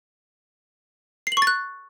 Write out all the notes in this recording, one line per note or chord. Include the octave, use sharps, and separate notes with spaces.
C7
F#7
C#6
A6
F#6